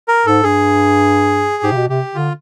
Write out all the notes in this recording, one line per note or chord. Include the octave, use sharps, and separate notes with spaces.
A#4
G#2 A4
G2 G#4
G#2 G4
C3
B2
C3 G4
D3 F4